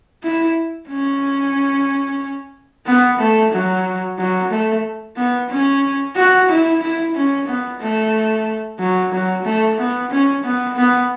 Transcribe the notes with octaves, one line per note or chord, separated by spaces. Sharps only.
E4
C#4
B3
A3
F#3
F#3
A3
B3
C#4
F#4
E4
E4
C#4
B3
A3
F#3
F#3
A3
B3
C#4
B3
B3